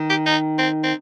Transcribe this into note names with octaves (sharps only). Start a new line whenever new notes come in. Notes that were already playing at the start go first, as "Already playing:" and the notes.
Already playing: D#3
G4
D#4
C4
C4